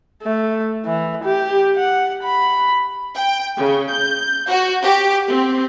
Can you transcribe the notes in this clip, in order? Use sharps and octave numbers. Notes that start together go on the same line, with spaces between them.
A3
E3
G4
F#5
B5
G5
C#3
G6
F#4
G4
C4